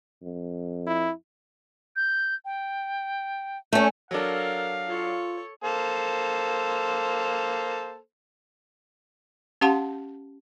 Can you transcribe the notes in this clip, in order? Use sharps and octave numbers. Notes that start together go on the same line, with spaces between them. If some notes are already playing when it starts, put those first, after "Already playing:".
F2
E4
G6
G5
A3 C#4 G6
F#3 D4 A4 A#4 F5
F4 A4 C#5
A#3 A4 C5
C#4 G4 F5 F#5 A5 C6